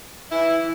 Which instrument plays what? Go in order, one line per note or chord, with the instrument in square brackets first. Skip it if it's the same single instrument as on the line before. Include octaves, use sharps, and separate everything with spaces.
[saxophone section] E3 E4